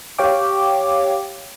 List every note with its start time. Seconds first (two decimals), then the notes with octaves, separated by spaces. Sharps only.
0.18 G4 C#5 F5 G5 D6